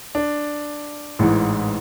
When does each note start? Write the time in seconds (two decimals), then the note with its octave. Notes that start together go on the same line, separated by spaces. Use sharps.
0.15 D4
1.19 A1 G#2 E3